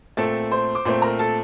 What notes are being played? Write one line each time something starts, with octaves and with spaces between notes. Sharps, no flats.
A#2 A3 C4 A4 A5
C5 C6
D6
A#2 A3 C4 C5 C6
A#4 A#5
A4 A5